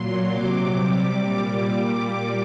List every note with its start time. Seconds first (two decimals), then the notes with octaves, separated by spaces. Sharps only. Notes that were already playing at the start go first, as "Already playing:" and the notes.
Already playing: A#2 F#3 C6
0.30 C3 F#3 D6
0.76 C3 G3 D6
1.21 A#2 G3